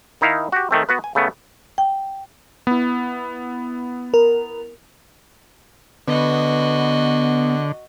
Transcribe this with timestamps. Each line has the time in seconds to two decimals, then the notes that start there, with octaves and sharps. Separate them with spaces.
0.21 D#3 D#4 E4 F5
0.52 F#4 G4
0.71 D#3 A3 C4
0.89 B3 F#4 B4
1.04 G#5
1.15 C#3 A3 B3
1.78 G5
2.67 B3 E4
4.14 A#4
6.07 D3 B3 F#4 D#5